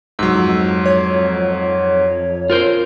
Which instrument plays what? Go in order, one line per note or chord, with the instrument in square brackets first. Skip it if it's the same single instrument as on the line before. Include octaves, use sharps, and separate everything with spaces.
[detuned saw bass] C2 [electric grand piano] G#2 F#3 [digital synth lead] E6
[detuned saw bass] F2
[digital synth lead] C#5
[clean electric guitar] F4 A#4 C5